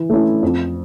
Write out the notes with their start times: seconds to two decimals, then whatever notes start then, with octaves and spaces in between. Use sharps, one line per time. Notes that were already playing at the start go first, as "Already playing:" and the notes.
Already playing: E3
0.10 A3 C#4 E4
0.43 F2